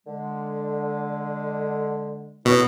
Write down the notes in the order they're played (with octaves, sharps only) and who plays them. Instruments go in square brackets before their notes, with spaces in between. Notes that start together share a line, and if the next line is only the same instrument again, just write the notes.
[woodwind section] D3 G#3
[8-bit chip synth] B2 [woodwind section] C#4 E4 A4